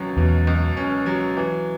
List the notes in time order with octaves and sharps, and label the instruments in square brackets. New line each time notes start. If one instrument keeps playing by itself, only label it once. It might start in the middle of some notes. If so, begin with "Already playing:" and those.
Already playing: [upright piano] C#2 B2 F#3 C#4
[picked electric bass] E2 [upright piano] B2
[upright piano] C#2
C#4
F#3
E3